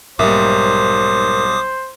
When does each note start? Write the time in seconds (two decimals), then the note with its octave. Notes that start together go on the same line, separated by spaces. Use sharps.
0.19 B1 G#2 G3 A#3 C5 E5 D6 D#6